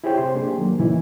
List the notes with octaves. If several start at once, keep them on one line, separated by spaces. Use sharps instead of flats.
E4 G4 G#4 C5 C#5 G5
C3 C5 C6
A#3 D4 G4 G#4
D#3 F#3 A#3
A#2 C#3 E3 C#4 D#4 E4